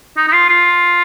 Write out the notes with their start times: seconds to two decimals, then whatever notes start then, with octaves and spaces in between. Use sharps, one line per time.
0.17 D#4
0.28 D#4
0.33 F4
0.49 F4